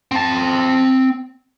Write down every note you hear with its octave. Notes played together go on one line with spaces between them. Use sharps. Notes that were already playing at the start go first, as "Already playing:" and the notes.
C4 A5